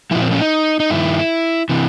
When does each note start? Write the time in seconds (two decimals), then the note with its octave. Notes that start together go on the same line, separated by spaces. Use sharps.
0.11 A#2 F3 E4
0.22 C4
0.31 C#4
0.41 D#4
0.80 D#4
0.90 G2 D#3 E4
1.69 C3 E3